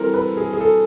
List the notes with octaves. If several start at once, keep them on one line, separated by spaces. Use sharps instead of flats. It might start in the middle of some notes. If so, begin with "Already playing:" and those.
Already playing: E3 G3 C4 E4 A4 A#4
B4
G#4
G#4
A4